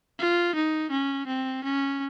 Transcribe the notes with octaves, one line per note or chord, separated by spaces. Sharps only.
F4
D#4
C#4
C4
C#4